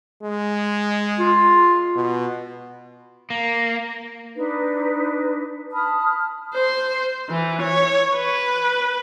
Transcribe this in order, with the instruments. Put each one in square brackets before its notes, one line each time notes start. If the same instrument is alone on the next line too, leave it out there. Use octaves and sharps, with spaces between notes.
[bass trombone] G#3
[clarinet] F4
[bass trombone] B2
[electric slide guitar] A#3
[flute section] D4 D#4 B4
A5 B5 D#6 F6
[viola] C5
E3
C#5
B4